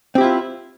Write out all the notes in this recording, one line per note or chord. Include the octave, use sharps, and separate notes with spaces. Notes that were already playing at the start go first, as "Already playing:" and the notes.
C4 E4 F4 G4